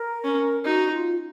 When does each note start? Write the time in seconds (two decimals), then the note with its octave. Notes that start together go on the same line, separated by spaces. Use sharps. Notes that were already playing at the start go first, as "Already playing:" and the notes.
Already playing: A#4
0.25 C#4
0.65 D#4 F#4
0.92 F4